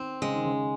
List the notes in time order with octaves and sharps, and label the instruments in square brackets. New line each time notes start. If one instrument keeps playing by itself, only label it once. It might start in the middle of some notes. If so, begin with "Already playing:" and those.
Already playing: [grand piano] D#3 [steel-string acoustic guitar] C4
[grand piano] C#3 [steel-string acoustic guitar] G#3
[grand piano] D#3
C#3